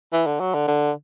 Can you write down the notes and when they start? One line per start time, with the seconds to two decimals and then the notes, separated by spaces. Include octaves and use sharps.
0.13 E3
0.27 D3
0.40 F#3
0.55 D3
0.68 D3